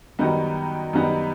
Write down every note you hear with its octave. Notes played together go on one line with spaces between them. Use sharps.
F#2 D#3 G3 B3 D#4
F#2 D#3 G3 B3 D#4